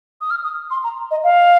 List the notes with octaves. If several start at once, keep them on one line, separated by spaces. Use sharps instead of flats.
D#6
F6
D#6
C6
A#5
D#5
F5